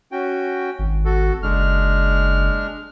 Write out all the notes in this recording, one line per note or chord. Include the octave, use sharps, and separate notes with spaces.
C#4 F#4 G5
G#1
F#4 A4
F#1 G#3 D4 F6